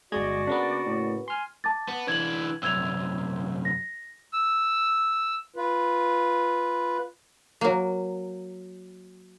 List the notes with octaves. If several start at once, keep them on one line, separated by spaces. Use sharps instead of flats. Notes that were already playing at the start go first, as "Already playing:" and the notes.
G1 G#3 F#4 D5 D#5 G#6
C#3 A#3 B3 D4
A2
G#5 C6 F6
A5 D6 A6
B3
E3 D4 G#6 F#7
C2 F#2 E6 G#6 F7
A#6
E6
F4 B4
F#3 A#3